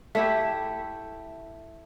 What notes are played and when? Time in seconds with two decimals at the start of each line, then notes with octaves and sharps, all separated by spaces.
0.15 A3 E4 G4